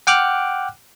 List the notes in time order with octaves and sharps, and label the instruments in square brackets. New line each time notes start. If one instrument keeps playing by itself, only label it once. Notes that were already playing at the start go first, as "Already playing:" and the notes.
[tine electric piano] F#5 G5 D6 F6 F#6